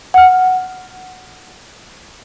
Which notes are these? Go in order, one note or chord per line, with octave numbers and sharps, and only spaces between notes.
F#5 F6